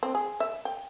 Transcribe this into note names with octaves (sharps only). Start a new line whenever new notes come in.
C4
G#4
E5
G5